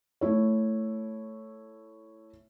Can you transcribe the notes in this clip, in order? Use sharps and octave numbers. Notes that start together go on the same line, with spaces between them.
A3 E4 C#5